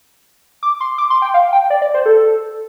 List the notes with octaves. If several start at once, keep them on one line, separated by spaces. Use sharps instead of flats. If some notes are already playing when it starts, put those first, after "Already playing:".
D6
C6
D6
C6
G5
F5
G5
D5
D5
C5
A4